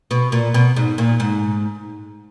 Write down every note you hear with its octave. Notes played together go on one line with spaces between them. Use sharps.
B2
A#2
B2
G#2
A#2
G#2